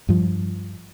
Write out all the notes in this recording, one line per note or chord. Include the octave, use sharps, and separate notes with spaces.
G2 F3